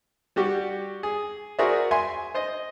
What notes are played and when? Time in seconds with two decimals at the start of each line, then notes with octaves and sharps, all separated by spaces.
0.36 G3 F#4 G4
1.03 G#4
1.59 F#4 G#4 A#4 C5 D5 E5
1.91 E5 G#5 C6
2.34 C5 D#5